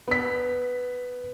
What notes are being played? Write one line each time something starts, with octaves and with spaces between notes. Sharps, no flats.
B3 B6